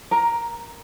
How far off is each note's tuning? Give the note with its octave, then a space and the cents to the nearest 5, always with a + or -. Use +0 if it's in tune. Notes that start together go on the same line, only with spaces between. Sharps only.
A#4 +20 A#5 +0